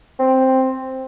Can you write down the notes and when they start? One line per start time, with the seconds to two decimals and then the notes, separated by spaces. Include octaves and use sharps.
0.19 C4